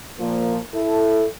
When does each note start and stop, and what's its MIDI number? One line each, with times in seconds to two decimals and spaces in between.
0.19 0.58 46
0.19 0.58 53
0.19 0.58 58
0.75 1.26 64
0.75 1.26 69